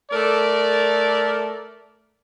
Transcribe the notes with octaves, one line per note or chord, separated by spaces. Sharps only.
A3 A#4 D5